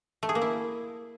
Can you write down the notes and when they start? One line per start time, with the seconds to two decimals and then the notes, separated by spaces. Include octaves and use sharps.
0.23 A3
0.29 G#4
0.35 A#3
0.42 E4